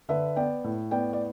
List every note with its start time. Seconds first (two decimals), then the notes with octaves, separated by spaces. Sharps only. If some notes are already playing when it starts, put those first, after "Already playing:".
0.09 D3 B4 E5
0.36 B3 D5 G5
0.64 A2
0.91 B3 D5 G5
1.13 D5